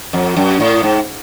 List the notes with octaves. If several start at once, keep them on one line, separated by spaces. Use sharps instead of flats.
F2
F#2
A2
G#2